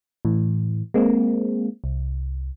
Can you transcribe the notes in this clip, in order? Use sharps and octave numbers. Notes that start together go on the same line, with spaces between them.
A2 E3
G#3 A#3 C4
C2